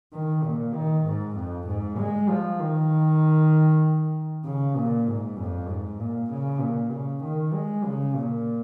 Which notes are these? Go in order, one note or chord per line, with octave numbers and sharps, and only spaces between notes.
D#3
A#2
D#3
G#2
F2
G#2
G#3
F3
D#3
C#3
A#2
G#2
F2
G#2
A#2
C#3
A#2
C#3
D#3
G#3
C#3
A#2